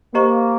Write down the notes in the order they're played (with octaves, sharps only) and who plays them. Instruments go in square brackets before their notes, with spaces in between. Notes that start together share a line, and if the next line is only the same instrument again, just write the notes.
[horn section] A#3 [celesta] G4 C5 D#5 A#5 C#6